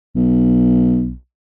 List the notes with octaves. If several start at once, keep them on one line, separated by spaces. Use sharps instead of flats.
B1